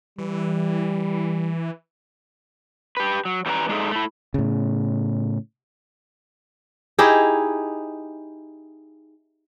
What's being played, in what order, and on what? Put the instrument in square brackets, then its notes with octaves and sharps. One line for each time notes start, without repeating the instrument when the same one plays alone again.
[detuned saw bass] E3 [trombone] G3
[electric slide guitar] G4 B4
F#3
E3 G3 C#4 D4 B4 A#5
G#3 D4 D#4 G#4 A4 E5
A3 E4
[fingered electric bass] A2 C#3
[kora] D#4 E4 G4 G#4